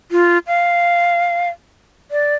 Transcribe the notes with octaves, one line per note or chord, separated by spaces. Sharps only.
F4
F5
D5